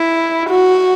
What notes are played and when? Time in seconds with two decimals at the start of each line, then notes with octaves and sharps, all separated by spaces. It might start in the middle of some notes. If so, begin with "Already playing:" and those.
Already playing: E4
0.50 F#4